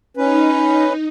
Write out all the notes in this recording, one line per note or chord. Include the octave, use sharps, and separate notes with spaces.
C#4 D#4 B4